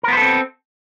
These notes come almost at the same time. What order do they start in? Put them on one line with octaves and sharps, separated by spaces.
A#4 B3 C5 A4 C4